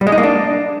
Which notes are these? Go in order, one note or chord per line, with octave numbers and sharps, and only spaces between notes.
G3
G#3
D#4
A#3
D4